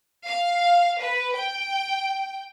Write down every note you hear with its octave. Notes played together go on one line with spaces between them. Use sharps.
F5
B4
G5